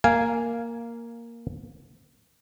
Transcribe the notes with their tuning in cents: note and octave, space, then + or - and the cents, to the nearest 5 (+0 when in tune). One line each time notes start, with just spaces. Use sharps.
A#3 +0 F5 -5 G#5 +0